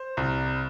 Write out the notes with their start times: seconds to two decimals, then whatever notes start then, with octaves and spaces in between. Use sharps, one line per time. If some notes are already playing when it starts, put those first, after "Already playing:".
Already playing: C5
0.17 C2